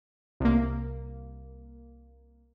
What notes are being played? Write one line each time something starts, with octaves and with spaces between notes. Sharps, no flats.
C2 A#3